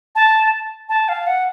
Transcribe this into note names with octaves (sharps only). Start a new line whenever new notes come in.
A5
A5
F5
F#5